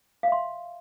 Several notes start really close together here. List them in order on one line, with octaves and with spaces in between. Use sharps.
F5 E5 C6